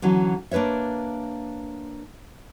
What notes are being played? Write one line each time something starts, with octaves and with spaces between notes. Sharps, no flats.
D3 E3 F#3 C#4
A#3 D4 B4 C#5 E5